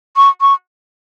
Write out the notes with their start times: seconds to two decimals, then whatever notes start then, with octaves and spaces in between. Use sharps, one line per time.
0.16 C#6
0.41 C#6